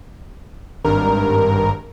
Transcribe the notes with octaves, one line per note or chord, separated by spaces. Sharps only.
G#1 G2 A#4